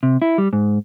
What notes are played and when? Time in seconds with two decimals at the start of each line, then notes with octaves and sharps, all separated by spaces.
0.03 C3
0.22 E4
0.38 G3
0.53 G#2